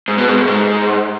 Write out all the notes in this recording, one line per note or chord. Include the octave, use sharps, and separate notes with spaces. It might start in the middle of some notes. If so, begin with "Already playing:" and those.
G#2
B2
G#2
A2
G#2